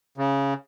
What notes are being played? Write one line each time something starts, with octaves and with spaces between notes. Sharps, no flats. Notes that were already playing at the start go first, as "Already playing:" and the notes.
C#3